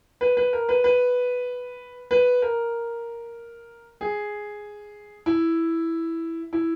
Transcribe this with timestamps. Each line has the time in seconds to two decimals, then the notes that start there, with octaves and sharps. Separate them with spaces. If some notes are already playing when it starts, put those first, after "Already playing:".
0.21 B4
0.37 B4
0.53 A#4
0.69 B4
0.84 B4
2.11 B4
2.42 A#4
4.01 G#4
5.26 E4
6.53 E4